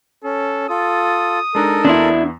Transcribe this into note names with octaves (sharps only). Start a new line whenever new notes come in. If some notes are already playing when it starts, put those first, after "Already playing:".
C#4 A4
F4 A4 D#6
G#3 D4 D#4 A4 A#4
E2 B3 D4 E4 C6